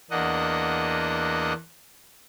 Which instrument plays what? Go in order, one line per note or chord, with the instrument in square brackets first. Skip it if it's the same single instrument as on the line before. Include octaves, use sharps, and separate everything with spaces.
[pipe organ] E2 A#3 D4 D#5 F#5